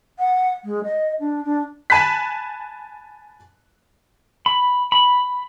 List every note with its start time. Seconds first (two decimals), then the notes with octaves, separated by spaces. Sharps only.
0.19 F#5
0.65 G#3
0.84 D#5
1.20 D4
1.45 D4
1.90 G#5 A5 B5 F#6 B6
4.46 B5
4.92 B5